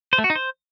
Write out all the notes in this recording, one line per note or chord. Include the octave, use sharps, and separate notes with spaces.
C5
A3
F#4
D#4
C5